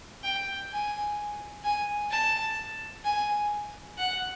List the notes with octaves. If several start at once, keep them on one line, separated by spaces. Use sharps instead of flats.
G5
G#5
G#5
A5
G#5
F#5